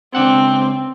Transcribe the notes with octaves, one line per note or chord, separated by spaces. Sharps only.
C#2 C4 D4 F#5